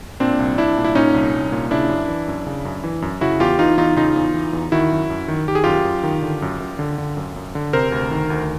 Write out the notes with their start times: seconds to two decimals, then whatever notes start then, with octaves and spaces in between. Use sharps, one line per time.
0.20 A#2 C4 D4
0.39 C2
0.58 C2 D4 E4
0.77 A#2
0.84 E4
0.95 A#2 C#4 D#4
1.14 C2
1.33 C2
1.52 A#2
1.71 C#3 D4 E4
1.90 F#2
2.08 E3
2.28 F#2
2.47 C#3
2.65 F#2
2.84 E3
3.02 F#2
3.21 C#3 E4 F#4
3.40 E2 F4 G4
3.59 E3 D#4 F4
3.77 E2 D#4 F4
3.96 C#3 D#4 F4
4.16 E2
4.34 E3
4.53 E2
4.72 D#3 E4 F#4
4.91 F#2
5.10 F#2
5.28 D#3
5.48 D#3 G4
5.55 G#4
5.64 F#2 F4 G4
5.85 F#2
6.04 D#3
6.22 D3
6.42 F#2
6.60 F#2
6.79 D3
6.98 D3
7.17 F#2
7.36 F#2
7.55 D3
7.73 C3 A#4 C5
7.92 D2
8.11 D#3
8.30 D2